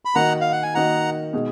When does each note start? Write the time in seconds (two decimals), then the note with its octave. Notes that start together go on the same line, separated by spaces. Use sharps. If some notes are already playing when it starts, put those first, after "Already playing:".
0.05 B5
0.15 D#3 A#3 D#4 F#4 F#5 A#5
0.41 F5
0.52 F#5
0.63 G#5
0.75 D#3 A#3 D#4 F#4 F#5 A#5
1.33 B2 G#3 D#4 G#4